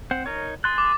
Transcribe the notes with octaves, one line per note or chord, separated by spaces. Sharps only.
C4 C5 F#5
D#4 A#4 C#5
G#4 C6 F#6 A6
D6